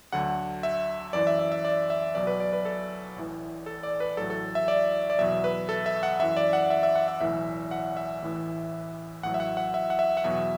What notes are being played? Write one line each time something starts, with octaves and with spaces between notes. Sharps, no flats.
D2 D3 F#3 F#5
E5
F#2 E3 D5
E5
E5
E5
D5
E5
B1 B2 F#3 D5
B4
D5
B4
A4
A1 A2 E3
A4
D5
B4
A1 A2 F#3 A4
A4
E5
D5
D5
E2 B2 F#3 E5
B4
A4
E5
F#5
F#2 E3 E5
D5
F#5
E5
E5
F#5
E5
B1 A2 E3 E5
F#5
E5
A1 A2 E3
A1 A2 F#3 F#5
E5
F#5
F#5
E5
F#5
E5
F#5
E2 B2 F#3 E5